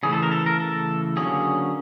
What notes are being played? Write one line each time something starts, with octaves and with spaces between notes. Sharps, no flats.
C#3 E3 A3 G#4
A4
A#4
A4
A#4
A4
D3 F#3 A#3 C#4 G#4